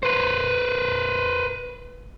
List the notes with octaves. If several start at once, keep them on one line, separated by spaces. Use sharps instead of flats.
B4 C5